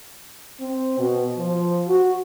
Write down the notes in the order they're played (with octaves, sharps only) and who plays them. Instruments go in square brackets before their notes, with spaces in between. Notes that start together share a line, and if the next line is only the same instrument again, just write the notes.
[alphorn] C4
B2
F3
F#4